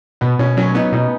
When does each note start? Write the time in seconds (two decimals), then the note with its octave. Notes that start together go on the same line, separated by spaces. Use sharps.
0.21 B2 B3
0.39 B2 C#4
0.57 F#3 C#4
0.75 B3 D#4
0.92 B2 D#4